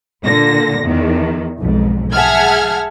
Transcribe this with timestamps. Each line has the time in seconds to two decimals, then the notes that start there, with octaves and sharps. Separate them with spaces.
0.24 A#2 D3 A#6
0.84 E2 D#3
1.59 B1 F2 G#2
2.12 G#4 E5 F#5 A5 F6 G#6